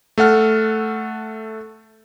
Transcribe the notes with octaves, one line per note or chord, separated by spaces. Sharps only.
A3 A4 F#5 F6